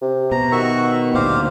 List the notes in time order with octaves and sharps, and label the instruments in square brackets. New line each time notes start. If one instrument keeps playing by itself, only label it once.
[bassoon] C3
[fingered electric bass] B2 [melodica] A#5
[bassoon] D#3 [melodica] F#4 E5 C#6
[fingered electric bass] D2 A#2 [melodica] G4 C5 F5